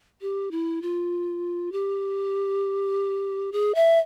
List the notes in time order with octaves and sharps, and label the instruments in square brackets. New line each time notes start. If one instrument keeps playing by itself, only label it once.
[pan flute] G4
E4
F4
G4
G#4
E5